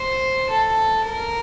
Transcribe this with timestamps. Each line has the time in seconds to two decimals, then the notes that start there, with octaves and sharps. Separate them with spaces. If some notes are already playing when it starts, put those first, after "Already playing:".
Already playing: C5
0.50 A4
1.04 A#4